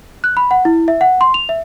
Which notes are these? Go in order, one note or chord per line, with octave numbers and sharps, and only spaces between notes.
F#6
B5
F#5
E4
E5
F#5
C6
F7
E5